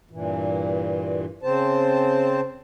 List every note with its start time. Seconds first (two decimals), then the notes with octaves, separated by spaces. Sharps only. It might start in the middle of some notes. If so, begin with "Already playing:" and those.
0.11 G2 A#2 E3
1.43 C#3 C4 C5 A5